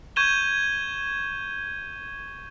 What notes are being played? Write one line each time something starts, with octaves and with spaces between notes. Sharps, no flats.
C#6 G6 G#6 D#7 E7 G7